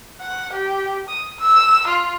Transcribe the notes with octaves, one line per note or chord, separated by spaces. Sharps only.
F#5
G4
D#6
E6
F4